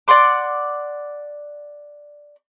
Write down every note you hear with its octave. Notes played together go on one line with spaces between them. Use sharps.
D5 F#5 C6 D6